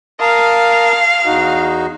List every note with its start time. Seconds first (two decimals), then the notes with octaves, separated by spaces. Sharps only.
0.20 A#4 F5 A5 D#6
1.25 E2 D#4 F#4